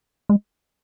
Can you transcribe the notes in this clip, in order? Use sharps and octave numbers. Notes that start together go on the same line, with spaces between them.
G#3